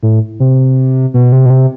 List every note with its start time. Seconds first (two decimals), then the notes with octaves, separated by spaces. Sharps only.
0.03 A2
0.40 C3
1.14 B2
1.32 C3
1.46 B2
1.50 C3